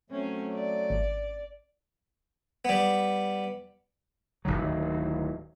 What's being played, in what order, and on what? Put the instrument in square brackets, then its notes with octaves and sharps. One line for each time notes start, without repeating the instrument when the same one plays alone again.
[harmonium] F#3 A3 [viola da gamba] C4 C#4
[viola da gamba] D5
[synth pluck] G#1
[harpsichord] G3 B3
[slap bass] D1 C2 D#3 F#3